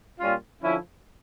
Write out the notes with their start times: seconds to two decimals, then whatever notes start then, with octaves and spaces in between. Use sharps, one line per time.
0.19 A#2 G3 C#4 F4
0.61 D3 F3 C#4 E4